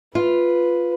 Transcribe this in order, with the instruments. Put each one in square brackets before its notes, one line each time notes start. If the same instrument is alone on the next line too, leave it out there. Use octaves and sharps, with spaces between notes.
[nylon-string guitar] F4 [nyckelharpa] B4